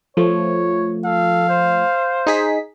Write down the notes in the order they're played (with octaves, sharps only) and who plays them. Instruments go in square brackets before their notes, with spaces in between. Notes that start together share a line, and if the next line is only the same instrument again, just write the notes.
[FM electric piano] F3 A3 [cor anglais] C#5
[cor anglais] A4 [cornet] F5
[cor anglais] C5
[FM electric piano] D#4 G#4 B6